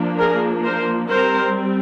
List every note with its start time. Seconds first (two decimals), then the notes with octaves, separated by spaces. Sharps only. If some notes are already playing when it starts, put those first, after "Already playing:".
Already playing: F3 A#3 D4
0.19 G#4 A#4
0.64 A#4 C5
1.11 G3 C4 A#4 C5